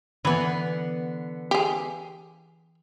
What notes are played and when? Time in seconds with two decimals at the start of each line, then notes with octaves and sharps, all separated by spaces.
0.25 D3 E3 B3
1.51 G4 G#4